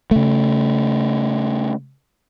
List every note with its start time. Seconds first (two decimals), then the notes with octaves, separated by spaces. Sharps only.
0.11 C#3 A3